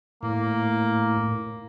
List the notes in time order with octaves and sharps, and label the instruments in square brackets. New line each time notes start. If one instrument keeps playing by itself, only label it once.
[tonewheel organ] A2 [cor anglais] A#3